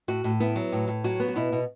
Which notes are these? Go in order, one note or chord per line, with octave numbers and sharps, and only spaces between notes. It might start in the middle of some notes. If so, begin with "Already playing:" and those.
A2 F#4
A2
B3 E4
F#3
A2
A2
F#3 F#4
B3
F#4
B2 E4
B2